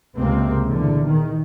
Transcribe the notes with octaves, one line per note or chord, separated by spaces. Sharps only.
C#2 C3 G#3 A#3 C4
E2 A#2 D3
D#3